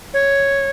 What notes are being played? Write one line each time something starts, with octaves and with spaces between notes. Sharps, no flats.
C#5